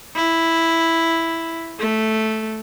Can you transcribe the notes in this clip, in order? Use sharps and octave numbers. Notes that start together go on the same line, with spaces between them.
E4
A3